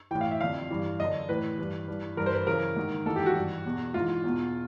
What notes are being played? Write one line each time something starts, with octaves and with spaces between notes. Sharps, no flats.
A2 E3 G5
F5
E5
F2 D3 F5
G2 E3
F#2 D3 D#5
A2 E3 B4
G2 E3
G2 E3
G2 E3 A#4
C5
B4
F#2 C#3 E3 A#4
G#2 D#3
G#2 E3 A4
G4
F#4
G2 E3
E2 B2
G#2 E3 F4
E2 B2